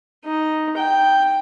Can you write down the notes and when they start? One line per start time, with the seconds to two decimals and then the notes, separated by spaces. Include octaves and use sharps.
0.25 D#4
0.77 G5